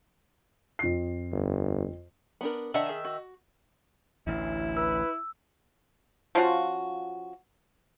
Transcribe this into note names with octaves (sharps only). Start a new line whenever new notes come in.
F2 C7
G1
B3 D4 A#4
D#3 D4 E5 F#5 A5
G#4
F#4
A1 D2 E4
B4 E6
F3 C#4 F4 F#4